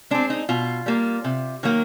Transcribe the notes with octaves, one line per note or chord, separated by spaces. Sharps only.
G#3 C4 D4
D#4
B2 F4
G3 A#3
C3
D#3 F#3 A#3